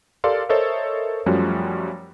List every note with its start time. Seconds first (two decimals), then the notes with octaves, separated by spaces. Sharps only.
0.24 G4 A4 A#4 D5 F5 C6
0.49 A4 A#4 C5 C#5 D#5 E5
1.26 F#2 F3 G3 A3 C#4 F#4